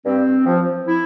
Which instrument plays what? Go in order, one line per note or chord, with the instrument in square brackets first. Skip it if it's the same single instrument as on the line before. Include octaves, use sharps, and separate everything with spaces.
[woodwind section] G2 C4
F3
E4